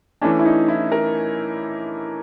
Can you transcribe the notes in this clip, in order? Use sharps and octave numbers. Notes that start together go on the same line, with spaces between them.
E3 A3 C#4 D4
E4
D#4
E4
A#4